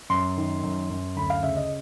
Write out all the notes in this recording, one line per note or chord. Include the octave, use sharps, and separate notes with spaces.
F#2 C6
D#3
F#2
F#2
D2 B5
F5
C#3 E5
D#5